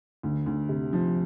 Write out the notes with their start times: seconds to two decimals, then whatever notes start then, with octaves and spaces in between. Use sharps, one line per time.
0.23 D2
0.46 D2
0.69 C3
0.93 F3